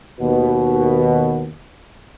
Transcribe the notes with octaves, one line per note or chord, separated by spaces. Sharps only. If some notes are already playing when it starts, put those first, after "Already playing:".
D#2 B2